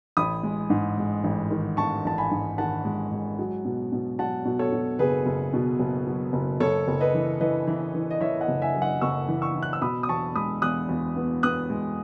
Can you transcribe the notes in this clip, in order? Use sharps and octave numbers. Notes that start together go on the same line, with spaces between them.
A1 B5 D#6
G#3
G#2
G#3
A1
D#3
A1 A5 C#6
A1 A5
G#5 B5
G#2
D#3 F#5 A5
G#3
G#3
F#3
B2
B2
F#3 F#5 A5
B2
A4 C#5
B2
F#1 G#4 B4
F#1
B2
F#1
F#3
F#1
F#1 A4 C#5
F#1
B4 D#5
E3
E3 B4 D#5
E3
E3
D#5
E3 C#5 E5
D#5 F#5
F#1
E5 G#5
F#2
D#5 F#5
F#1 C#6 E6
E3
C#6 E6
E3
F#6
E6
B2 B5 D#6
D#6
E2 A5 C#6
G#3 B5 D#6
E2 D#6 F#6
E2
B3
B3 D#6 F#6
G#3